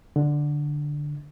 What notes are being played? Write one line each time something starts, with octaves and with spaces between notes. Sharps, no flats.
D3